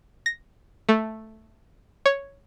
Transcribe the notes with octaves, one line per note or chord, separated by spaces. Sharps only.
A#6
A3
C#5